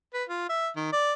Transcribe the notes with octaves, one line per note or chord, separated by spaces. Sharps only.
B4
F4
E5
D#3
D5